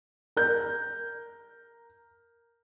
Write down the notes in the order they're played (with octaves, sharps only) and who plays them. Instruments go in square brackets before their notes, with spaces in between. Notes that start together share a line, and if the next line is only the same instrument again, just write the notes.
[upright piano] A#4 G6